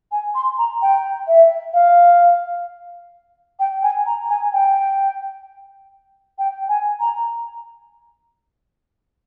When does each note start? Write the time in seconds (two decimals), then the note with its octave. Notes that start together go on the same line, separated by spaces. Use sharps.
0.12 G#5
0.35 C6
0.58 A#5
0.82 G5
1.28 E5
1.74 F5
3.60 G5
3.83 G#5
4.06 A#5
4.29 G#5
4.53 G5
6.39 G5
6.69 G#5
7.00 A#5